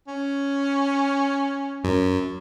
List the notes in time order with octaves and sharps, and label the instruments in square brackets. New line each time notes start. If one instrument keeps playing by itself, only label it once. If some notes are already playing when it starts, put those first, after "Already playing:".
[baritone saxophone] C#4
[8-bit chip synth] F#2